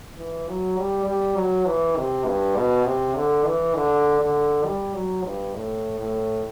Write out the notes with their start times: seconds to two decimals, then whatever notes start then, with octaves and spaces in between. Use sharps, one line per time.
0.17 E3
0.48 F#3
0.77 G3
1.06 G3
1.37 F#3
1.66 E3
1.97 C3
2.26 G2
2.56 B2
2.85 C3
3.15 D3
3.46 E3
3.75 D3
4.21 D3
4.65 G3
4.94 F#3
5.25 G2
5.54 A2
5.99 A2